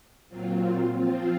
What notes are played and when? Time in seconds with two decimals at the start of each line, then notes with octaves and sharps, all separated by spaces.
0.29 A#2 F#3 C4 F4
0.93 F3 C4 F4